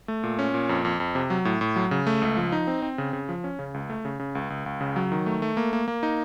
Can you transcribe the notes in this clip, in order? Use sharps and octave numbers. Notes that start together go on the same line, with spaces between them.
A3
A#2
C#4
A#2
F2
F2
F2
C3
F#3
A2
A2
F#3
C#3
A3
C#2
F3
D#4
C4
C4
C#3
C#3
F3
C#4
C#3
C#2
A3
C#3
C#3
C#2
C#2
C#2
C#3
F#3
D#3
A3
A3
A#3
A#3
A#3
D#4